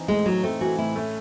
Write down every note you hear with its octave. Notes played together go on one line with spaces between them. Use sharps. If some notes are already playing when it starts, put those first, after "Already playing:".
Already playing: E3 C4 D#4
A2 G#3
F#3 D#4
A3 C4
E3 F#4
A2 E4
A3 C#4